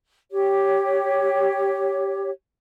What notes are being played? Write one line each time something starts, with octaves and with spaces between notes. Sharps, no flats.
G4 C#5